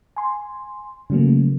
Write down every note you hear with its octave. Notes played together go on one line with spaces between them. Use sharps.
G#5 C6
C#3 E3 F#3 A3 A#3